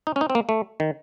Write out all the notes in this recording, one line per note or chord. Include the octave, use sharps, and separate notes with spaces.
D#4
C#4
D#4
C4
A#3
A3
D#3